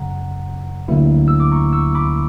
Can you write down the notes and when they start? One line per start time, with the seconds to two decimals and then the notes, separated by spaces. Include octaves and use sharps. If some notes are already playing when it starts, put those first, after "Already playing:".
Already playing: F#2 C#3 F#3 F#5 A#5
0.88 D2 D3 F#3 A#3 E4
1.28 E6
1.40 D6
1.52 A#5 C#6
1.73 C#6 E6
1.95 B5 D6